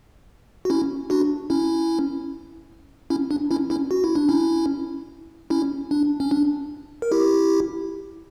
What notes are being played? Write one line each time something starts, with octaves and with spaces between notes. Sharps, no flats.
F#4
C#4 E4
D4 F#4
C#4 E4
C#4 E4
D4
C#4 E4
C#4 E4
F#4
E4
D4
C#4 E4
C#4 E4
D4
C#4
D4
A#4
E4 G4